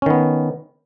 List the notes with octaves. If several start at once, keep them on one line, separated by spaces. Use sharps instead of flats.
D#3 B3 C#4